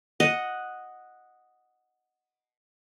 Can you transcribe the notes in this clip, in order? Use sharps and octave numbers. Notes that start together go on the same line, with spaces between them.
D#5 F#5